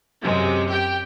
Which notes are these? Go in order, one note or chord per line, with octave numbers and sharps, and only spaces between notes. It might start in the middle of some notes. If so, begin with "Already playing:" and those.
F#2 C3 G#3
G4 G5